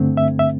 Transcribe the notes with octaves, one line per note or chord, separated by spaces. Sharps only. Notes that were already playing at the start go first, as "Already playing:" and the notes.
Already playing: G2 D3 A3 C4
E5
E5